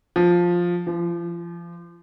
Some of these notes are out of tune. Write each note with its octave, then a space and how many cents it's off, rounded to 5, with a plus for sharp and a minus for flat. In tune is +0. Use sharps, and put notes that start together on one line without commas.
F3 +5
F3 -35